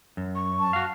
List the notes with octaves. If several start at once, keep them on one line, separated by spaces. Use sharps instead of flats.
F#2
C#6
A5
F#4 F5